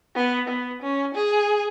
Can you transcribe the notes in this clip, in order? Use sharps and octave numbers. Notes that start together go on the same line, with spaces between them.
B3
B3
C#4
G#4